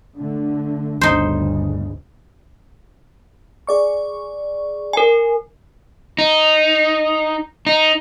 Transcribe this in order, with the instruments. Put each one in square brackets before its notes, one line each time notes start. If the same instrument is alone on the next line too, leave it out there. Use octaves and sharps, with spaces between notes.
[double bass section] D3 A3
[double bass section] G1 D2 C#3 [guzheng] D#4 C5
[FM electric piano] G#4 D5 C#6
[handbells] A#4 G#5
[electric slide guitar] D#4
D#4